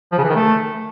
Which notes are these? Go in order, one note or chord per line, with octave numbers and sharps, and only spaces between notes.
F3
C#3
E3
D#3
A3